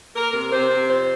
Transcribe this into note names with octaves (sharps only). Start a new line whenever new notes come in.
A#3 A#4
C3 A#4
C3 C5
C3
F2 C5